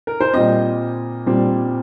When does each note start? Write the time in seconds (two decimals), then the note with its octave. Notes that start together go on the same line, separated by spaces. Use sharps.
0.07 A#4
0.21 C5
0.33 A#2 G3 C4 D#5
1.26 A#2 G3 C4